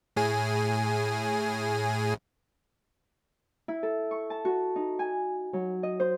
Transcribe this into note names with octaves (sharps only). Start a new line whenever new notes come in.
A2 G#4 G#5
E4
A4
C#6
A5
F#4
D#4
G#5
F#3
D#5
C5